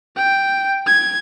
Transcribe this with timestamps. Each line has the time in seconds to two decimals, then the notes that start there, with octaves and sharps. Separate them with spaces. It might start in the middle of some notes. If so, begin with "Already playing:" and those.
0.16 G5
0.86 G#6